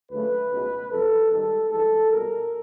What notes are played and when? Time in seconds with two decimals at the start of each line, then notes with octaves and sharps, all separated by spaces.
0.11 D2 C#3 F#3 A3 B4
0.51 C#2 B2 G#3
0.91 F2 C#3 F#3 A4
1.31 G#2 D#3 G3 A4
1.70 G2 E3 G#3 A4
2.09 C2 B2 G3 A#4